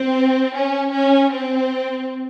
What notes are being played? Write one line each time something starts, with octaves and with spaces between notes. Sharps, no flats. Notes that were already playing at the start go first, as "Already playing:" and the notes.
Already playing: C4
C#4
C#4
C4